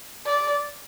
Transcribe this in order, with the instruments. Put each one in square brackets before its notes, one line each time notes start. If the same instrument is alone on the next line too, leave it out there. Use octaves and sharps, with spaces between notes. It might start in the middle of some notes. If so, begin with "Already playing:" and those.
[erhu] D5